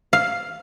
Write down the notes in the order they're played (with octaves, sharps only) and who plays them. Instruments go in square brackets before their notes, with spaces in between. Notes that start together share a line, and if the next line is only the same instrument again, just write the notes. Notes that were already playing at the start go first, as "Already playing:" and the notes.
[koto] F5